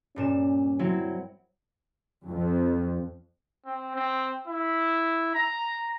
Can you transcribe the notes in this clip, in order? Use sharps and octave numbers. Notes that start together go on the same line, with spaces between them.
G2 A#2 C#4 E7
F#3 C4 E4
F2
C4
C4
E4
A#5